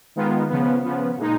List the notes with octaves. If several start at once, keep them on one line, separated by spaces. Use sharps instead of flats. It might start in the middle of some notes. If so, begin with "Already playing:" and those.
D#3 G#3 B3 F4
C#3 F3 B3
C#3 F3 B3
A#2 G#3 D#4